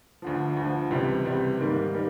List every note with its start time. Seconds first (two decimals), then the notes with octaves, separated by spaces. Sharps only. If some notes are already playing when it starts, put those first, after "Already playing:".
0.22 D2 D3 F3
0.57 D2 D3 F3
0.91 C#2 C3 E3 G3
1.25 C#2 C3 E3 G3
1.60 G#2 D#3 G3 A#3
1.94 D#3 G3 A#3